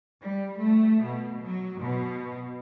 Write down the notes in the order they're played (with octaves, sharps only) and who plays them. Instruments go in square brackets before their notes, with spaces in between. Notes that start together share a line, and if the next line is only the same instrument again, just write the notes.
[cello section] G3
A3
B2
F#3
B2